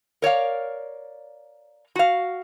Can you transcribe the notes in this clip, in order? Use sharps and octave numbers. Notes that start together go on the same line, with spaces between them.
A#4 C#5 D5 F5
F#4 F5